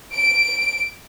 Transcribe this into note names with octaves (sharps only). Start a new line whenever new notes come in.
D7